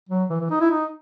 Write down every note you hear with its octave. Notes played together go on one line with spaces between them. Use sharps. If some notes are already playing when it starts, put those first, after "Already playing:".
F#3
E3
E3
D#4
E4
D#4